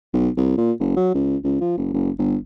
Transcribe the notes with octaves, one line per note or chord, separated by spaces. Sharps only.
B1
C2
A#2
F#1
F#3
C#2
C#2
F3
F#1
F#1
G1